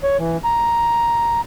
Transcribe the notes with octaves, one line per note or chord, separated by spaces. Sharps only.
C#5
E3
A#5